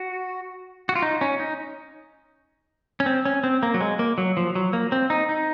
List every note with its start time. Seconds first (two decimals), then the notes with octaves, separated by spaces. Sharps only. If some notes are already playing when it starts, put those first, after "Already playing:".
Already playing: F#4
0.89 F#4
0.95 F4
1.02 D#4
1.21 C#4
1.40 D#4
3.00 C#4
3.06 C4
3.26 C#4
3.44 C4
3.63 A#3
3.74 F#3
3.81 G#3
3.99 A#3
4.18 F#3
4.37 F3
4.55 F#3
4.73 A#3
4.92 C4
5.10 D#4
5.29 D#4